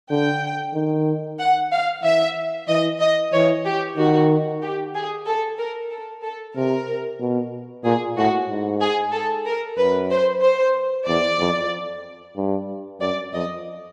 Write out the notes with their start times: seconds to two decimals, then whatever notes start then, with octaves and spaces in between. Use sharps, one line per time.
0.11 D3 G5
0.74 D#3
1.39 F#5
1.72 F5
2.03 E3 E5
2.68 E3 D#5
3.01 D#5
3.33 E3 C#5
3.65 G4
3.97 D#3 F#4
4.62 G4
4.95 G#4
5.27 A4
5.59 A#4
5.91 A4
6.24 A4
6.55 C3 A#4
7.20 B2
7.84 A#2 G#4
8.18 A2 F#4
8.49 G#2
8.82 G#4
9.13 A4
9.46 A#4
9.78 F#2 B4
10.11 C5
10.42 C5
11.08 E2 D5
11.39 F2
12.37 G2
13.01 F#2 D5
13.34 F2 D#5